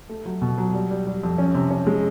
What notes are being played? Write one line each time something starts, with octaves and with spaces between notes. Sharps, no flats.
A3
F#3
B2
F#3
G3
G3
G3
F2
C#4
C3
C#4
G#3